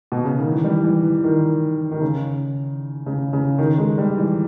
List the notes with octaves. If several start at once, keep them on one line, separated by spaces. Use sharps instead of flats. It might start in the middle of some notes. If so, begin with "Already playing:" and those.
B2
C#3
D#3
E3
G3
E3
E3
D#3
D#3
C#3
C#3
C#3
D#3
G#3
G3
E3